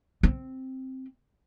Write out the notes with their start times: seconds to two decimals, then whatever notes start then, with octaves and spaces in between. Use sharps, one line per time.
0.23 C4